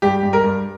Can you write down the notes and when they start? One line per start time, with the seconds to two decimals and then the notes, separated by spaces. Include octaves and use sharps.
0.02 G2 G4
0.23 G2
0.33 A#4
0.44 G2